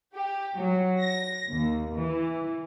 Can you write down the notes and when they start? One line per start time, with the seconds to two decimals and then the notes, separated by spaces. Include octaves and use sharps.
0.13 G4
0.56 F#3
1.01 A#6
1.50 D#2
1.96 E3